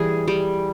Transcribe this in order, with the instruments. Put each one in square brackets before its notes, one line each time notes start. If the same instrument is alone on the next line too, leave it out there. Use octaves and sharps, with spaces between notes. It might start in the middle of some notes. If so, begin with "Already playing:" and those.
Already playing: [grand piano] E3 [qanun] G3 G#4
[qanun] G3